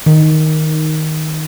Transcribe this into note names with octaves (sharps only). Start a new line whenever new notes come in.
D#3